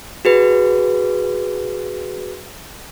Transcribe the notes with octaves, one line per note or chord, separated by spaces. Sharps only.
F#4 G#4 B4